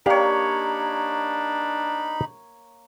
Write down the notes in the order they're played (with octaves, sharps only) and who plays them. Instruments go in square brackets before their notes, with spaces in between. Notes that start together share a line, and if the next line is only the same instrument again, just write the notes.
[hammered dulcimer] A#3 C#5 [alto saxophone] D4 [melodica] D#4 B5 [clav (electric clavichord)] G4 D5 F5